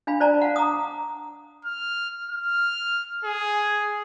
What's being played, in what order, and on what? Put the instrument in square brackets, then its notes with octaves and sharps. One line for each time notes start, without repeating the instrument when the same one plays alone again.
[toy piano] D4 F5 G#5 B5
C5 D5 A5 A#5
F5 F#5
A#5 D6 D#6
[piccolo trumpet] F6
F6
G#4